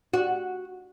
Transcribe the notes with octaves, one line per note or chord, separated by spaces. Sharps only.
F#4